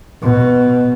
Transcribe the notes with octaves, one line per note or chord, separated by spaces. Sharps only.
B2